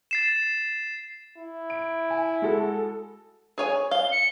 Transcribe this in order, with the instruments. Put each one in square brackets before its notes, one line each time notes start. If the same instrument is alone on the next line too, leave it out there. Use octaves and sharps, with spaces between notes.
[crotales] A6 C7 E7
[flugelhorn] E4
[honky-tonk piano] D7
G#5
G#3 F#4 A4
[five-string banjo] G#4 C#5 G#5
[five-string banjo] F5 [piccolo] G7
[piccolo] C#7